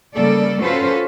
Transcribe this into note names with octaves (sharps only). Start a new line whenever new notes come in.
C#3 G3 A#3 A4 D5
C#4 F4 F#4 A4 B4 C5